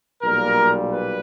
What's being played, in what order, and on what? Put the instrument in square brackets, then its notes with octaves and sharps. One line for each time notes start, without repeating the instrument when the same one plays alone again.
[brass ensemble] B1 A#2 G3 A#3 A#4
B4